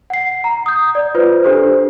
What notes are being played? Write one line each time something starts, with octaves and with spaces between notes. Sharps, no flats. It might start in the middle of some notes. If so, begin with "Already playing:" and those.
F#5 C7
A#5
D#6 G6
D5
F4 B4 C5
D4 G4 A4 C5